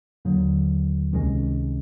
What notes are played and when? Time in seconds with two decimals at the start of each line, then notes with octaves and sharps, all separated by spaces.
0.25 D#2 D3 F#3 A#3
1.13 C#2 C3 D#3 G#3 C#4